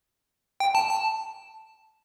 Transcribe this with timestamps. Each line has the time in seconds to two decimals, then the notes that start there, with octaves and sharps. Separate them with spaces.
0.60 G5
0.75 A5
0.89 A5